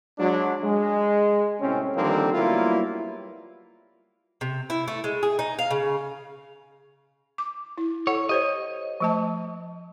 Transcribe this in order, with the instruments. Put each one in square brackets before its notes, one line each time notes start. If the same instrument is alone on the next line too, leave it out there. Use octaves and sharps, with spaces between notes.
[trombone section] F#3 G#3 D4
G#3
A2 C3 C4 C#4
D3 D#3 F3 G3 A#3 C4
F#3 G3 A#3 B3 E4 F4
[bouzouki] C3
E4
A3
G#3
G#4
D#4
F5
C#3
[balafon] D6
E4
[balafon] A4 F#5 [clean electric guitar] C#5
[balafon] G4 C5 C#5 [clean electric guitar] D#5
[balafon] F3 A3 A5